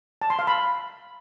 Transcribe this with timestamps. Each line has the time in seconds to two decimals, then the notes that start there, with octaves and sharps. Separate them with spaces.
0.22 A5
0.30 C6
0.39 F5
0.47 B5